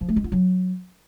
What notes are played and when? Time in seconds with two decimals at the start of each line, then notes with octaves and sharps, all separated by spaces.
0.01 F3
0.09 A3
0.16 G#3
0.24 F4
0.32 F#3